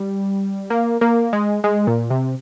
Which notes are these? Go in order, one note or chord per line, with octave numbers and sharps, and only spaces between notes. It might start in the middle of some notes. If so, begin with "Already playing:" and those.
Already playing: G3
A#3
A#3
G#3
G#3
A#2
C3